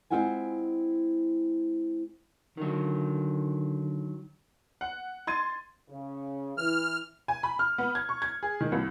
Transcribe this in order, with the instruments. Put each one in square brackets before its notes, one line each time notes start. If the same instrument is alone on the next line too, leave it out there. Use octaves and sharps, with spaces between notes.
[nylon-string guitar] G#3 C4 E4 F4 F#5 G#5
[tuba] D3 [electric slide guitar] D#3 F#3
[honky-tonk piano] F#5
C6 G#6 A6 D#7
[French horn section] C#3
[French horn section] E3 [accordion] F6
[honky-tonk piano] G#5
B5
F6
B3
G#6
C#6
G#6
G#4
D#3
C2